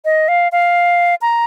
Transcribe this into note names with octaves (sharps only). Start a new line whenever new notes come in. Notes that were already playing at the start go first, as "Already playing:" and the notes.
D#5
F5
F5
A#5